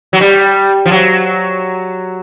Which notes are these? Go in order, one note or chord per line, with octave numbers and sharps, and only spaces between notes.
F#3
G3
F3
F#3